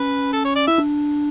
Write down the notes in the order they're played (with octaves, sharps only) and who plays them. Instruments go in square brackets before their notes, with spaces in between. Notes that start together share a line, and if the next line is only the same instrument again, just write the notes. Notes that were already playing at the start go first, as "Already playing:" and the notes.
Already playing: [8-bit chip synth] C#4 [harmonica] B4
[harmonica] A4
C#5
D5
[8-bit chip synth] E4 [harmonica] E5
[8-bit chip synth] D4